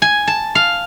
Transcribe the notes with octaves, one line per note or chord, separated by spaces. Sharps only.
G#5
A5
F5